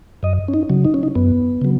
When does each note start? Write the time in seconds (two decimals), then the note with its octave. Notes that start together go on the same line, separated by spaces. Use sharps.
0.23 F#2 D#5
0.48 C#4
0.54 D#4
0.69 C#3 F#3
0.85 D#4
0.94 C#4
1.03 D#4
1.15 F#2 B3
1.62 C#3 F#3